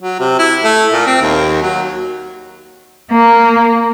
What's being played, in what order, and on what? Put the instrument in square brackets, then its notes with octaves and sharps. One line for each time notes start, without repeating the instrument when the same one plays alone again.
[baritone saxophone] F#3
C3
E4
A3
A#2
C4
D#2
F#3
[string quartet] A#3